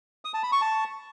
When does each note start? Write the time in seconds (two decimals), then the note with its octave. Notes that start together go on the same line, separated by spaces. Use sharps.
0.25 D#6
0.34 A5
0.43 B5
0.52 C#6
0.61 A5